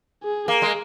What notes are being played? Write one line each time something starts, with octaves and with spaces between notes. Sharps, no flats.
G#4
A#3
G#3